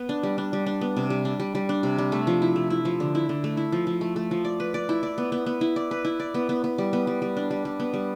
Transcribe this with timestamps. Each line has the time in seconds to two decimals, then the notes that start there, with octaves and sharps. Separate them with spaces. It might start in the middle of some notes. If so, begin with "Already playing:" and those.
Already playing: B3
0.09 D4
0.23 G3
0.38 D4
0.53 G3
0.66 D4
0.81 B3
0.97 C3
1.10 G3
1.25 D4
1.40 G3
1.55 G3
1.69 D4
1.83 C3
1.98 G3
2.12 A3
2.27 F3
2.42 E4
2.56 A3
2.70 E4
2.85 F3
3.00 D3
3.15 E4
3.29 D3
3.44 A3
3.57 E4
3.72 F3
3.87 F3
4.01 A3
4.16 A3
4.31 F3
4.45 D5
4.60 B4
4.74 D5
4.89 E4
5.03 D5
5.18 B3
5.32 B3
5.46 B3
5.61 E4
5.76 D5
5.91 B4
6.05 E4
6.20 D5
6.34 B3
6.49 B3
6.64 B3
6.78 G3
6.93 B3
7.07 G3
7.22 G3
7.37 D4
7.51 G3
7.65 G3
7.80 B3
7.94 G3